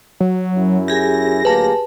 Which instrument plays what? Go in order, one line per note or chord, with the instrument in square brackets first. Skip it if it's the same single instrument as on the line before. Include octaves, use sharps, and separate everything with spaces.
[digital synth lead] F#3
[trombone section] F#2 C#4 E4
[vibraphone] G4 G#4 G#5 [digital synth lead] A#6
[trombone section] D2 F#3 A#3 [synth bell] B4 A5